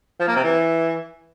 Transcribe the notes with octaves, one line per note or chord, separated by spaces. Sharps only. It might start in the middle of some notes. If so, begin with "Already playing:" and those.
F3
A#3
C3
E3